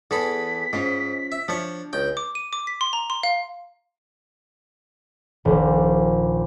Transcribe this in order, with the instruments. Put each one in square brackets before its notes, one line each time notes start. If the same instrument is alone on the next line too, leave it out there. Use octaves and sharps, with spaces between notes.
[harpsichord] E2 G#4 B5 [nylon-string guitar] E3 A4 [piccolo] B6
[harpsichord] G#2 [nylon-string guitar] C#4 F4 C5
[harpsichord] E5
[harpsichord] F3 C#5 [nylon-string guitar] D4
[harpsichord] C#2 G5
[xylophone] D6
D#7
D6
B6
C6
A#5
C6
F5
[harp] D#1 A#1